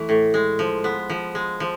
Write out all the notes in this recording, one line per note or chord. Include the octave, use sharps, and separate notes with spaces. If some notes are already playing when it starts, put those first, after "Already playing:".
Already playing: E3 A3
A2
G#3
F3
B3
F3
G#3
F3